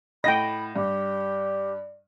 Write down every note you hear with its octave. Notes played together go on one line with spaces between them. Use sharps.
A2 D#5 F#5 G5 B5 A#6
G2 G4 D5